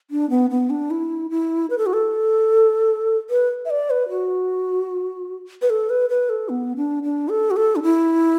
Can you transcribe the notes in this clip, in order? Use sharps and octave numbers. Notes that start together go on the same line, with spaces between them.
D4
B3
B3
D4
E4
E4
B4
A4
F#4
A4
B4
E5
D5
B4
F#4
B4
A4
B4
B4
A4
B3
D4
D4
A4
F#4
A4
D4
E4